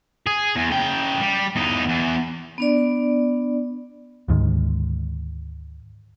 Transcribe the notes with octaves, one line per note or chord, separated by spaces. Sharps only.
G#4
E2
C#3 G5
G3
E2 D#4
E2
B3 D4 D5
D2 G#2 D#3 G#3